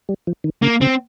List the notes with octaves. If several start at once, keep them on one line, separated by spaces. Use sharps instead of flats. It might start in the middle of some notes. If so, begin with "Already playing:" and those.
G3
F3
D#3
C#3 A#3
C#3 C4